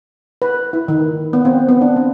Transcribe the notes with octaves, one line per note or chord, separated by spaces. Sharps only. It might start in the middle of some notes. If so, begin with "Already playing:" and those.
B4
E4
D#3
B3
C4
B3
D4
C4